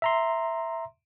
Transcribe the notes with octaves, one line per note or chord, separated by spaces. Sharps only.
E5 A#5 C6